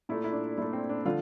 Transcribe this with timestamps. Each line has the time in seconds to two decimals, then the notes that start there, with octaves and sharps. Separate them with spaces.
0.09 A#2 A3 E4
0.24 E4
0.33 D4
0.57 A#2 A3 E4
0.73 C4
0.89 D4
1.05 D3 F3 A3 F4